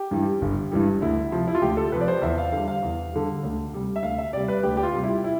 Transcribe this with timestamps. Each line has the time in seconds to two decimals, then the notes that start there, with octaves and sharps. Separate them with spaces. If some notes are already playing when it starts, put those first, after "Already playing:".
Already playing: G4
0.11 G2 E3 G3
0.41 G1
0.72 G2 E3 G3
1.01 D2 E4
1.32 C3 F3
1.48 E4
1.55 F4
1.61 D2 G4
1.77 A4
1.92 C3 F3 B4
2.01 D5
2.08 C5
2.22 E2 E5
2.38 F5
2.52 D3 G3 F5
2.68 F5
2.83 E2
3.13 D3 G3
3.43 D2
3.73 C3 G3
3.96 E5
4.03 D2 F5
4.18 E5
4.33 C3 G3 D5
4.48 B4
4.63 D2 G4
4.77 G4
4.83 F4
4.94 C3 G3
5.04 E4
5.24 E4